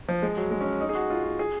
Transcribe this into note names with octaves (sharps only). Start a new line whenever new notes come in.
F3
G#3
F#3
G#3
C#4
D#4
G#4
F#4
F4
F#4
G#4